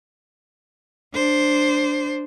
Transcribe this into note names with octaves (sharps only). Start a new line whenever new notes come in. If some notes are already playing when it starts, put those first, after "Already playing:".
D4 C5